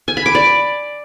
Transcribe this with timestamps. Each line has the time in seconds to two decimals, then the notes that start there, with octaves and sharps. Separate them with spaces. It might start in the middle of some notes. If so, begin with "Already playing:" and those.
0.08 G#5
0.17 B5
0.26 D6
0.35 D5